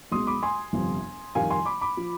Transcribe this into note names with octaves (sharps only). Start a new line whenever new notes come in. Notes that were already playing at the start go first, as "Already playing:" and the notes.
B1 B2 G#3 C6 D#6
B5 D6
G#5 C6
G1 F2 C3
F2 D#3 G3 F5 G#5
G#5 C6
B5 D6
B5 D6
F3